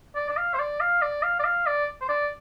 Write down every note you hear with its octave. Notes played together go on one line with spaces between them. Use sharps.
D5
D5
F5
C5
D5
F5
D5
F5
D5
F5
D5
C5
D5